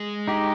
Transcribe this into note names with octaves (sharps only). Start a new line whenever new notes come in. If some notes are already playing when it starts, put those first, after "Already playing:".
Already playing: G#3
D#4 G4